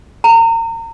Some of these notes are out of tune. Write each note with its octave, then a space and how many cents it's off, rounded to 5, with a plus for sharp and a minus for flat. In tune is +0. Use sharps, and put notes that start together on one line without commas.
A#5 -30